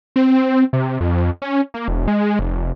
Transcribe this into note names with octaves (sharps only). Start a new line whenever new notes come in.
C4
C3
F2
C#4
A#3
E1
G#3
F1